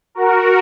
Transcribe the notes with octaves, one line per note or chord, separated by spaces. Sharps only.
F#4 A#4